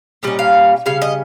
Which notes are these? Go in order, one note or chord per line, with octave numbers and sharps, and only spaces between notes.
A#2 G3 C#4 D#5
F5
C#3 G3 F5
D#5